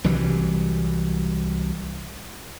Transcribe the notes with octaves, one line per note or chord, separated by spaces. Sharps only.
C2 E3 F#3 G3